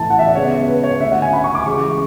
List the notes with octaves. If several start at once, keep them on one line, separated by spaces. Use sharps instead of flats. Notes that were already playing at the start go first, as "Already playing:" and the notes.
Already playing: A2 E3 A3 C#4 A5
F#5
E5
D5
C#3 G#3 B3 C#5
B4
C#5
D3 A3 C#4 E5
F#5
G#5
B5
C#6
D6
C#3 E3 G#3 C#4 C#6